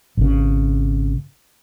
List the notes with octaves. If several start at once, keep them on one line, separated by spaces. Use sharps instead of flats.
G#1 C#3